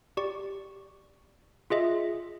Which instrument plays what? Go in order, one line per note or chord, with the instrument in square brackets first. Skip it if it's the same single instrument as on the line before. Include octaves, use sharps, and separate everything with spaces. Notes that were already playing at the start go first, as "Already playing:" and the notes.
[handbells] G4 D5 C#6
F4 G#4 D#5 E5